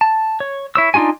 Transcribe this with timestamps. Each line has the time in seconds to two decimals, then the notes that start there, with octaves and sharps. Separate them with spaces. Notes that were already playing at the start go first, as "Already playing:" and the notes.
0.01 A5
0.40 C#5
0.75 E4 C#5 E6
0.94 D4 D#4 F4 F#4 G#5